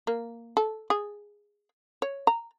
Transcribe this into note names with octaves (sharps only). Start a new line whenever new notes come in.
A#3
A4
G#4
C#5
A#5